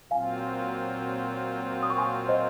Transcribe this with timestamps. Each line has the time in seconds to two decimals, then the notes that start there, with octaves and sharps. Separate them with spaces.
0.11 A#2 F#3 C4 F4 F5 G#5
1.83 D#6
1.90 C#6
1.98 G#5 C6
2.29 C5 D#5